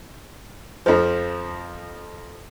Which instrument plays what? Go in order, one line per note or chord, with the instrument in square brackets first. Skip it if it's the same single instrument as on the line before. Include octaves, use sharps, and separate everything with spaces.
[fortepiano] F2 F3